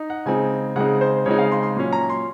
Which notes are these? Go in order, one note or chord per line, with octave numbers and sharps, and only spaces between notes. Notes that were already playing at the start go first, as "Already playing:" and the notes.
Already playing: D#4
F#5
C#3 G#3 C4 D#4 G#5
C#3 G#3 C4 D#4 F#5
C5
C#3 G#3 C4 D#4 C#5
F5
C6
C6
A#2 F#3 C#4
A#5
C6